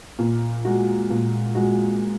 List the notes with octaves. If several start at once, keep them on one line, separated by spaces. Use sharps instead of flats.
A#2
G#3 F#4
A#2
G#3 F#4